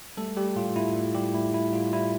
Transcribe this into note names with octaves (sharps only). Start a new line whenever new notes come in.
G3 A3 A4
G3 G4
A2 F4
A2 E4
G3
G3 G4
A2 E4
A2 E4
G3 F4
G3 E4